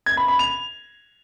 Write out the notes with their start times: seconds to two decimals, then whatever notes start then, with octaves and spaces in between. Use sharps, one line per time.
0.06 G#6
0.17 B5
0.28 B5
0.39 F7